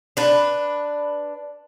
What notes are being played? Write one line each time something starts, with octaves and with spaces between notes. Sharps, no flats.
D4 B4